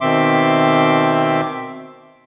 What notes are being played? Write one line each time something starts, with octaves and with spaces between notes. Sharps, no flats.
B2 D#3 C4 E5 C6 D6